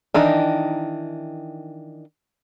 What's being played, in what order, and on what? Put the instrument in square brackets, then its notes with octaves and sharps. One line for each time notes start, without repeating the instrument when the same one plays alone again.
[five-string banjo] D#3 E3 D4 D#4